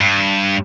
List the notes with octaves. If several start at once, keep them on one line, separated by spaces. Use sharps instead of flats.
G2